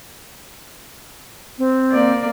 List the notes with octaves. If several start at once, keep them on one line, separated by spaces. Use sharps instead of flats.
C4
A#3 D5